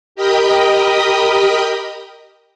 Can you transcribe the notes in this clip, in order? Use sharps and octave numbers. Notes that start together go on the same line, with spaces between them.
G4 A#4 D#5 G5 B5 D#6